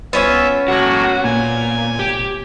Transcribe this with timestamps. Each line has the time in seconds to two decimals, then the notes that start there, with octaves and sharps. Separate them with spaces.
0.13 C2 B3 C#4 F4 C#5 E5
0.68 E1 A2 F#3 A#3 F#4
1.24 A#2 A#3 G#5
1.99 F1 G4